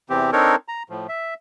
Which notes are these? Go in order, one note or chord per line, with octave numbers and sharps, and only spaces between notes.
E2 C3 E3 C4 G4
C4 D4 D#4 A4 A#4 C#5
A#5
A2 F3
E5